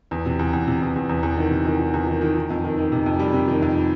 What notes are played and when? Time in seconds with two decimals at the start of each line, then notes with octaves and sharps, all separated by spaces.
0.11 E2
0.26 C3
0.39 E2
0.53 E2
0.67 C3
0.82 E2
0.96 E2
1.09 E2
1.23 E2
1.37 D#3
1.51 C3
1.65 D#3
1.80 D#3
1.94 E2
2.07 D#3
2.21 D#3
2.36 D#3
2.50 F2
2.64 D#3
2.78 D#3
2.92 C3
3.06 F2
3.19 G3
3.33 C3
3.48 D#3
3.62 F2